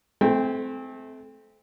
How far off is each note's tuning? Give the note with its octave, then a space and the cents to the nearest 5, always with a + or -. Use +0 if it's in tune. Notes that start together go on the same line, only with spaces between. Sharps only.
A3 -30 C4 -15 G5 +35